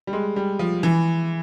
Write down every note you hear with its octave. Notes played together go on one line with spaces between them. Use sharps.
G3
G#3
G3
F3
E3